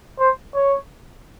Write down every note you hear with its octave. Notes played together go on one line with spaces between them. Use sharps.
C5
C#5